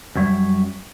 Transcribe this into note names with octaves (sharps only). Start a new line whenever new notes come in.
F#2 G3 C#5 E5